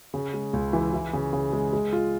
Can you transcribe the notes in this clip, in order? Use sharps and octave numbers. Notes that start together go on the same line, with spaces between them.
C#3
G#3
C#2
E3
E3
C#3
C#3
G#3
G#3
F4